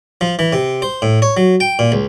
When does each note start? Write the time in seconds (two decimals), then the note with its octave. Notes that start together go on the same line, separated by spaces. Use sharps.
0.21 F3
0.39 E3
0.53 C3
0.82 C5
1.02 A2
1.22 C#5
1.37 F#3
1.60 G5
1.79 A#2
1.92 C#2